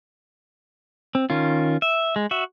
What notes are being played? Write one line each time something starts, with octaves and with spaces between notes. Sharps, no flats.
C4
D#3 C#4 F4
E5
G#3
F#4 E5